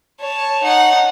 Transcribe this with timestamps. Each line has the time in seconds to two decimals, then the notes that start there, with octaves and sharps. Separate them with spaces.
0.20 C#5 A5
0.63 D#4 F#5